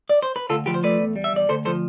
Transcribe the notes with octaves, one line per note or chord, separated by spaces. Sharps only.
D5
C5
B4
D2 F4 A4
F3 G4 B4
C5
A3 B4 D5
E2
G3
E5
E2 D5
D2 A4 C5
F3 A4 C5